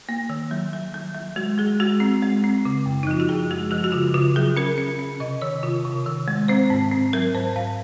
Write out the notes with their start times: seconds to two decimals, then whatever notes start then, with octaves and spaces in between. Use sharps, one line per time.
0.09 A#3
0.30 D#3
0.51 F#3
0.73 F#3
0.94 F#3
1.15 F#3
1.36 G#3 F#4
1.58 G#3 G#4
1.80 G#3 F#4
2.00 C4
2.22 G#3
2.44 C4
2.65 C#3
2.86 F#2
3.03 D#4
3.07 F3 F4
3.20 F#4
3.29 F#2 G#4
3.51 G#3 F#4
3.71 F3 F#4
3.84 F#4
3.92 C#3 F4
4.14 C#3 F4
4.36 F#3 G#4
4.57 C#4 A#4
4.78 C#4
4.99 C#4
5.20 C3 D#5
5.42 D#3 C#5
5.63 C3 F4
5.85 C3
6.06 D#3
6.28 G#3
6.48 C4 C5
6.70 G#2
6.91 C4
7.13 F#3 A#4
7.34 G#2 C5
7.56 G#2 F5